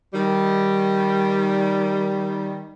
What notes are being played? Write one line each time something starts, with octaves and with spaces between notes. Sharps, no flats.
D#3 G3